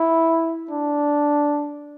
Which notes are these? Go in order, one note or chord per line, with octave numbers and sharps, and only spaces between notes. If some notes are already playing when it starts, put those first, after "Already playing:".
Already playing: E4
D4